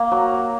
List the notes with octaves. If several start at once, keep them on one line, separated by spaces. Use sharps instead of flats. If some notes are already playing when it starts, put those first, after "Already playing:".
Already playing: A#3
F#3